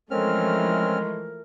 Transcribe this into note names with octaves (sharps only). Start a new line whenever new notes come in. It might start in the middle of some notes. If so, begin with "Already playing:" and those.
E3 F3 G#3 A3 C4 C#4 A#4 F6